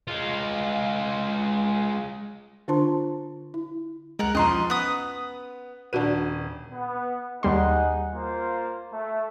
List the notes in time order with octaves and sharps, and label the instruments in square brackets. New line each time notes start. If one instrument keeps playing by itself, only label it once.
[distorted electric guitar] G#3 F4
[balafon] D3 D4 F4 C5 A5 C6
E4
[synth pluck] C#2 G#3 [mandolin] A#4 F#5
[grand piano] B1 F3 [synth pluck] E2 [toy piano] C#4 A#5 [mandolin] D#5 C6
[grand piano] B3 [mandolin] B4 D#6
[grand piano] D#1 D#7 [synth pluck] D4 F#4 B4
[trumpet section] B3
[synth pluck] D#2 G3 C6 [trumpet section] D#4 G#4 F#5
[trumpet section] A#3 F4 C5
A3